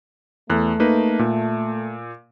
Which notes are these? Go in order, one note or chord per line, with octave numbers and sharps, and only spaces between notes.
E2 A3 F#6
A#3 D#4 B4
A#2